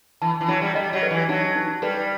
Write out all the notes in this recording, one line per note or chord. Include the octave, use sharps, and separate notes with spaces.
E3 A5
E3
F#3 E4
G3
G3 D#5
F#3
B4
E3
F#3 D#4
D#4
G3 B4